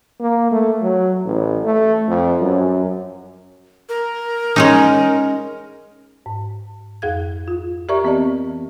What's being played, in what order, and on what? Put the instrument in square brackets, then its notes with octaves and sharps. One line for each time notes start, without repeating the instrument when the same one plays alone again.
[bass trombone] A#3
A3
F#3
A1
A3
F2
F#2
[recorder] A#4
[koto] G#3 C#4 D#4
[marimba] G#2
F2 G#4 F5 G#6
F4
G4 A#4 D5 E5 A#5 C#6
E3 B3 C4 G4 D5 D#5